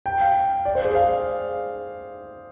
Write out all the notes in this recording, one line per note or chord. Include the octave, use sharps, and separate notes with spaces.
G5
F5
D5
C5
G#4
F5